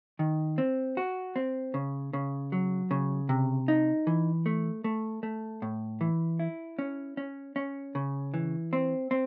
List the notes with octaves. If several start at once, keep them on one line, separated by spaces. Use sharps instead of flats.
D#3
C4
F#4
C4
C#3
C#3
F#3
C#3
C3
D#4
E3
A3
A3
A3
A2
E3
E4
C#4
C#4
C#4
C#3
E3
C4
C4